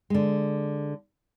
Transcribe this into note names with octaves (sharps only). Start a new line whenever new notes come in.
D3 G#3